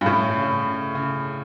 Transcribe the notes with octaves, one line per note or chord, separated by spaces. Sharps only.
G2
A2 C#4
C#3
C#3
C#3